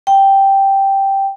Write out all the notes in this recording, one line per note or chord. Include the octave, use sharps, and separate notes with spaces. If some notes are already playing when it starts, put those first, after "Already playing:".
G5